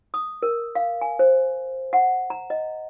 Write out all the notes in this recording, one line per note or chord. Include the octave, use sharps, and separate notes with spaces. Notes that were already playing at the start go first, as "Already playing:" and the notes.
D#6
A#4
F5
G#5
C5
F#5
A#5
D#5